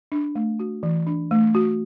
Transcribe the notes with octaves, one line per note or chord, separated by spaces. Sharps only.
D4
A3
F#4
E3
D4
A3
F#4